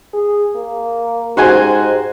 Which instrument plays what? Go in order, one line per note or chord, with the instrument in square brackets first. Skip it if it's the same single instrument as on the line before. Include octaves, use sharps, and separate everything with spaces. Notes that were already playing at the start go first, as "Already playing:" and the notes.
[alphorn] G#4
A#3
[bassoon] G#2 [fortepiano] F#4 C5 G#5 [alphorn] G4